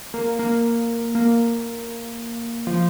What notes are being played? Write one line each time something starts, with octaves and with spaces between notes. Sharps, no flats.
A#3
A#3
A#3
F3